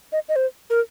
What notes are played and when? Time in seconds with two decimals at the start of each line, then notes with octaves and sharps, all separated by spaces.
0.12 D#5
0.29 D#5
0.36 C5
0.70 A#4